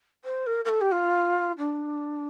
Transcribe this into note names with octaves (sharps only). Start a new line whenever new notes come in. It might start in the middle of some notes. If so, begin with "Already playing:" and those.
C5
A#4
A#4
A4
G4
F4
D4